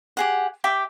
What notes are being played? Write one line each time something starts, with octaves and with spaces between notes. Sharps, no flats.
G4 G#4 F#5
G4 E5 G5 D6